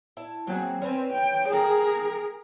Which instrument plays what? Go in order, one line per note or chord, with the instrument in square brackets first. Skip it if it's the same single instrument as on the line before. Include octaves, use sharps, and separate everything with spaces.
[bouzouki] E4 A5
[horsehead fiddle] F#3 [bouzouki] A#3 C4 G#4
[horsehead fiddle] C4 [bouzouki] C#4 B4 C#5
[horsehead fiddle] G5
[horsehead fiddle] G#4 A#4 [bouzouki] G5